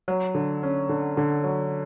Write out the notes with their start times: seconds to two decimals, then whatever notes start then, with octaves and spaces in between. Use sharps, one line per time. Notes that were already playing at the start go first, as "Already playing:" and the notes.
0.08 F#3
0.35 D3
0.63 C#4
0.89 D3
1.17 D3
1.44 F#3